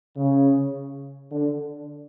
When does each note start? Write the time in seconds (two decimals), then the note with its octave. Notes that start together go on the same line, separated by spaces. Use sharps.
0.17 C#3
1.32 D3